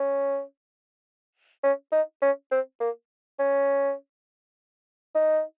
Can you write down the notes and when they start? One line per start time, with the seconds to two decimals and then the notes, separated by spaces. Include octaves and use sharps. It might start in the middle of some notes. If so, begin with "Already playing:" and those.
Already playing: C#4
1.63 C#4
1.92 D#4
2.22 C#4
2.51 C4
2.80 A#3
3.39 C#4
5.15 D#4